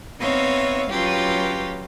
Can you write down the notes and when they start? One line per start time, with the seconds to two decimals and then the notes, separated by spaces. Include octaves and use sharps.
0.21 B3 C4 D#4 C#5 E5 F5
0.90 F#3 C#4 F4 G4 B4